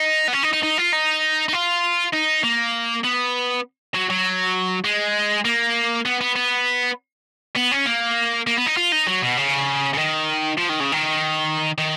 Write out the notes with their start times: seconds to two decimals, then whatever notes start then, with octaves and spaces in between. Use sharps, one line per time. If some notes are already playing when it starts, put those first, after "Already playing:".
Already playing: D#4
0.28 B3
0.33 C#4
0.43 D#4
0.53 D#4
0.63 D#4
0.78 F4
0.93 D#4
1.48 D#4
1.53 F4
2.13 D#4
2.44 A#3
3.04 B3
3.95 F#3
4.10 F#3
4.85 G#3
5.45 A#3
6.05 B3
6.21 B3
6.36 B3
7.56 B3
7.72 C#4
7.86 A#3
8.47 A#3
8.57 B3
8.66 D#4
8.77 F4
8.92 D#4
9.07 F#3
9.22 B2
9.37 C#3
9.93 C#3
9.98 D#3
10.58 F3
10.69 D#3
10.80 C#3
10.92 D#3
11.78 D#3